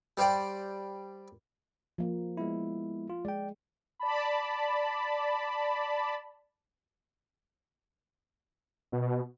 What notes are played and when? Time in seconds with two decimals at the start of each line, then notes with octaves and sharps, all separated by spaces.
0.17 G3 C5 D5 G5
1.98 F3 A#3
2.37 G#3 B3 E4
3.10 F4
3.25 G#3 D5 G5
4.00 D5 A5 B5
8.92 B2